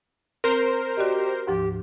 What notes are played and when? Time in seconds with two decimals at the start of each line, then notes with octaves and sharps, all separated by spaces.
0.44 C4 A#4 C5
0.97 F#4 G4 D5 D#5
1.47 D2 G#2 F3 G4